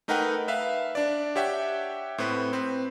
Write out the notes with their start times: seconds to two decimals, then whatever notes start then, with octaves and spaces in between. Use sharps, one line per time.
0.08 A3 D#4 A#4 B4 F#5 G5
0.48 B4 E5 F5
0.95 D4 D5
1.36 G4 C#5 E5 F#5 G5
2.18 A2 C4 B4
2.53 C4 B4